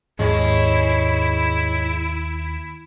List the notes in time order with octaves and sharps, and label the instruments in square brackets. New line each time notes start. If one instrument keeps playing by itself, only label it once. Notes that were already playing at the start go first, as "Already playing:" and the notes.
[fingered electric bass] D#2 [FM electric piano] G#2 [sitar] G#3 C#4 [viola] E4